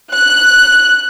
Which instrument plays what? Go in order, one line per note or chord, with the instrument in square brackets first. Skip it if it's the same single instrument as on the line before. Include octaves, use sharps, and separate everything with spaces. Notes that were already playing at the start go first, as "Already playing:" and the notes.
[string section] F#6